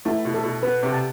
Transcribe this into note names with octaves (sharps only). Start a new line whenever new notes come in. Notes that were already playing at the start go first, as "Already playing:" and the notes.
A3 E4
B2
A4
B2
B3 B4
C3
A5